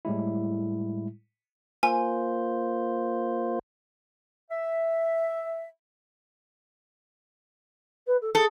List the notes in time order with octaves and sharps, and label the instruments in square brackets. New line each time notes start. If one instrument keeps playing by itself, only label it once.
[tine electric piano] A2 G3 G#3 E4
[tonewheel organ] A#3 F4 C5 [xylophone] G#5
[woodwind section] E5
[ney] B4
A4
[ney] G#4 [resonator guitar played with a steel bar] A4